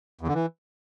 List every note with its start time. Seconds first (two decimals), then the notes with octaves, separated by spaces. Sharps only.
0.21 E2
0.28 D3
0.34 E3